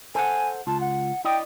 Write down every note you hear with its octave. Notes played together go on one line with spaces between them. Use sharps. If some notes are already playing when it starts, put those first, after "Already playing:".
A4 C5 F#5 G#5
C#2 F4 A5
F#5
E4 D5 D#5 G5